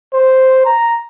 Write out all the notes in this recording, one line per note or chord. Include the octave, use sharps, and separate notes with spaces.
C5
A#5